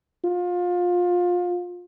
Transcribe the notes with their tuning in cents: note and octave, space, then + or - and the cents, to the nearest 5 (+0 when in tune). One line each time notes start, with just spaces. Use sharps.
F4 +25